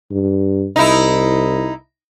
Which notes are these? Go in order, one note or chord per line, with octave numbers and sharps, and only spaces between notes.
G2
C2 D#4 E4